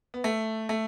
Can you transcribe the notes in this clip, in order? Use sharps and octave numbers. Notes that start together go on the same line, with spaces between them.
B3
A3
A3